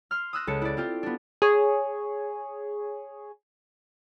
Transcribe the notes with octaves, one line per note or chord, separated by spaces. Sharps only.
C6 F6
D#6 E6 F#6 A#6
C#2 A4 A5 C#7
E4 D5
C4 F4 G4
B3 D4
G#4 C#5